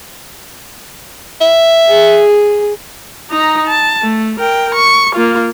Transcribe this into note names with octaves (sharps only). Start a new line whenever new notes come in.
E5
G#4
D#4 A#5
A5
A3
A#4 G5
C#6
A#3 F4